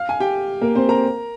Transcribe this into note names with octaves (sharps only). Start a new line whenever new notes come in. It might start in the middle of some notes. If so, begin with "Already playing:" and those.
Already playing: F5 F6
G#5
G4 G5
A#3 A#4
C4 C5
A#4 A#5